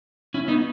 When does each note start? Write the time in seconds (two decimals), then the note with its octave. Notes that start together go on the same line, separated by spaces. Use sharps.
0.34 C#4 E4
0.48 B3 D#4